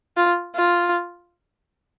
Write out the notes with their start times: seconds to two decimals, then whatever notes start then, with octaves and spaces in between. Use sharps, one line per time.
0.17 F4
0.56 F4